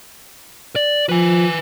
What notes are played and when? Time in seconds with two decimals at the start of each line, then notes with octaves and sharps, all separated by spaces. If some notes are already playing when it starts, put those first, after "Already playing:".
0.76 D5
1.09 F3 B4 G#5